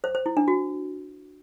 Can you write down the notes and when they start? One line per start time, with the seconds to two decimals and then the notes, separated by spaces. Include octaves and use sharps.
0.04 C5
0.15 C5
0.26 E4
0.37 D4
0.48 F#4